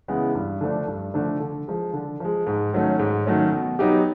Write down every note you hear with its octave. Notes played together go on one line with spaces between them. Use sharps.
C#3 E3 G#3 B3
G2
D3 F3 A3 D4
G2
D3 F3 A3 D4
D3
F3 G#3
D3
F3 G#3
G#2
D#3 F#3 A3 C#4
G#2
D#3 F#3 A3 C#4
B2
F#3 B3 D#4 G4